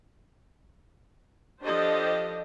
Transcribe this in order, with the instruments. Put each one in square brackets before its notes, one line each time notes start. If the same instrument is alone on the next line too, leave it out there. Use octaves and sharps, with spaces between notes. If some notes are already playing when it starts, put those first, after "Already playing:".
[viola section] F3 D4 G4 A4 C5 D#5